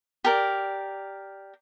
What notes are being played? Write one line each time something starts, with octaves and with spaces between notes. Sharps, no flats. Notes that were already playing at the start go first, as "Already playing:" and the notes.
G4 A#4 D5